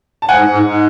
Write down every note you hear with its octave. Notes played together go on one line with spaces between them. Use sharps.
A5
G#2 F#5 G#5
G#2
G#2